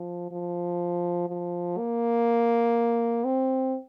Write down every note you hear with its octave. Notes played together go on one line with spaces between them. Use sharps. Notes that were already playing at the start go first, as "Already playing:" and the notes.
Already playing: F3
F3
F3
A#3
C4